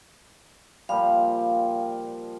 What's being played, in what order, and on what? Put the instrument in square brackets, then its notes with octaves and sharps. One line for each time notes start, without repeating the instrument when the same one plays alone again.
[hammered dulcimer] A#2 F3 G3 [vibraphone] F5